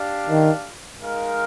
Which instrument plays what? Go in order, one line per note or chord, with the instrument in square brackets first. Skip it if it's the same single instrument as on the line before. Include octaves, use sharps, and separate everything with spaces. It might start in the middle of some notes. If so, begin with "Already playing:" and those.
Already playing: [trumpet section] D4 G4 D5 F5
[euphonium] D#3
[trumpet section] G#3 D#4 A#4 F5